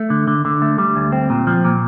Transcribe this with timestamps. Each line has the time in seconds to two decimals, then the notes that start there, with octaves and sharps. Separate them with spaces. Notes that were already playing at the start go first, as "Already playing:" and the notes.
Already playing: A3
0.10 D3
0.28 D3
0.45 D3
0.62 A3
0.78 G3
0.96 D2
1.12 C4
1.30 A#2
1.47 F3
1.64 A#2